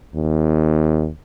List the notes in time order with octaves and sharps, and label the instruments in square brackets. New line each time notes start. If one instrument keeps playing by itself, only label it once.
[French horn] D#2